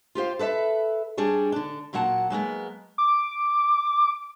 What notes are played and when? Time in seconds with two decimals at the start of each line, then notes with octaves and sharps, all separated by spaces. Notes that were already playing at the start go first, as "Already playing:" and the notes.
0.15 F4 G4 C5 F5
0.39 A4 B4 D5 E5
1.17 G3 D4 G#4 C#5
1.52 D3 D4
1.93 A#2 F#3 A#3 F#5 A5
2.30 F#3 G#3 A#3 B3
2.98 D6